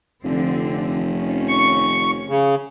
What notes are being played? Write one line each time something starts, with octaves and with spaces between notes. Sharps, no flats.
F1 D3 F3 C4
D#3 F3 C#4
C#6
C#3